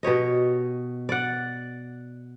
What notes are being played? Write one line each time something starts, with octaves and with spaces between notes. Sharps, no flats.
B2 G4 C#5 D#5
D5 F#5